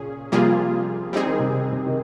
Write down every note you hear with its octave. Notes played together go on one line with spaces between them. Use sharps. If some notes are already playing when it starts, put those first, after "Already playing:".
Already playing: A#2 C#3 C#4 G#4
C3 F3 G3 A#3 F4 G#4
G3 C4 D#4 G#4
D#3
C3
C3
D#3